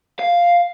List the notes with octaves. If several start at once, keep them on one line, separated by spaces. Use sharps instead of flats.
F5